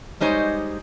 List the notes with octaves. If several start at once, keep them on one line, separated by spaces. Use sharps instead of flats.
G3 G#3 D#4 C5 C#5